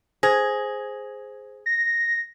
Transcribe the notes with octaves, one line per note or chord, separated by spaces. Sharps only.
G#4 C5 G#6 A#6
A#6